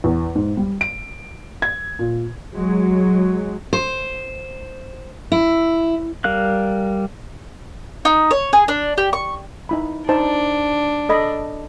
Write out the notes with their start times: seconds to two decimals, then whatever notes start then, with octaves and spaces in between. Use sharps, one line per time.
0.04 E2
0.35 G#2
0.57 G3
0.81 D7
1.62 G#6
1.99 A#2
2.55 F#3 G#3
3.73 C5
5.32 E4
6.24 G3 A#4 F5 F#6
8.05 D#4
8.31 C#5
8.53 G#4
8.68 D4
8.98 G4
9.13 C#6
9.69 D#4 E4 B5
10.09 D4 D#4 C5 A5
11.09 A4 D#5 B5